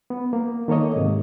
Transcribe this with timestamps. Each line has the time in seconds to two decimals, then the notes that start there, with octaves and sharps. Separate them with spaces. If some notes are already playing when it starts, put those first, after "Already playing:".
0.10 B3
0.33 A#3
0.68 D#3 A#3 A4 C#5 D#5
0.96 G#2 C3